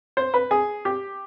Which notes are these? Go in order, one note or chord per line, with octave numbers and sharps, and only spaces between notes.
C5
B4
G#4
G4